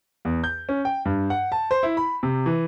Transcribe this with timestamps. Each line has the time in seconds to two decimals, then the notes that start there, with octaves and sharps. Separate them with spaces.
0.25 E2
0.44 G6
0.69 C#4
0.85 G5
1.05 G2
1.30 F#5
1.52 A5
1.71 C5
1.83 E4
1.97 B5
2.23 C3
2.46 E3